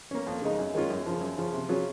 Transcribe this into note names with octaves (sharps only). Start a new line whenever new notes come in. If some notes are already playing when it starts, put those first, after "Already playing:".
A#3 C#4
F2
C#3 G#3 D#4
F#2
D#3 G#3 C#4 F4
F#2
C#3 F3
F#2
C#3 F3
C3
F#3 C#4 F4 G#4